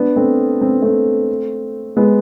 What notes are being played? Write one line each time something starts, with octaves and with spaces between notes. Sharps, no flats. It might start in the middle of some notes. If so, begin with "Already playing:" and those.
Already playing: B3 D4
A3 C4
C4
B3
A3 C4
G#3 B3